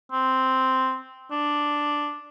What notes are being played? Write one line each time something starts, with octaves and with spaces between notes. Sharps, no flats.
C4
D4